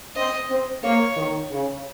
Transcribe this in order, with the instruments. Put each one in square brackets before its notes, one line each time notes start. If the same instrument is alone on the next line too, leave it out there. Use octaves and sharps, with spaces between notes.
[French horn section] C4 [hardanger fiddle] D#5
[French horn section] C4
[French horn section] A#3 [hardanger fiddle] C#5
[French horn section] D#3
C#3